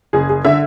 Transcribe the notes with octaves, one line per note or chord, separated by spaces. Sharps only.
F#1 G#4
G#4
D3 E5